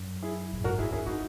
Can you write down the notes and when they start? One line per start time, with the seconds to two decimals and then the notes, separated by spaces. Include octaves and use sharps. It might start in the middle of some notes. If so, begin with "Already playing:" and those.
Already playing: F#2
0.23 E4 G#4
0.53 A#2
0.64 G#2 F#4 A#4
0.78 C#3 E4 G#4
0.92 C#3 E4 G#4
1.06 G#3 D#4 F#4